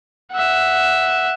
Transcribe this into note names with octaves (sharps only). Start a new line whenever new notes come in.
E5 F#5